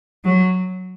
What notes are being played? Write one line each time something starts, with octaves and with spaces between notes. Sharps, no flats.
F#3